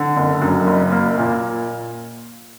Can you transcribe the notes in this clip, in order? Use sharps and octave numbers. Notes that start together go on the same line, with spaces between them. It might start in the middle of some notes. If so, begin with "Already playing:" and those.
Already playing: D3
F#1
F#2
F#1
A#3
A#2